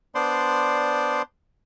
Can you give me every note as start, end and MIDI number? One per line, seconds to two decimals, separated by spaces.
0.15 1.22 59
0.15 1.22 62
0.15 1.22 72
0.15 1.22 74
0.15 1.22 84